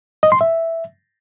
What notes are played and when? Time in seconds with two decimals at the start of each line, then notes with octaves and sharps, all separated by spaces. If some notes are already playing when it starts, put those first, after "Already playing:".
0.23 D#5
0.32 C6
0.41 E5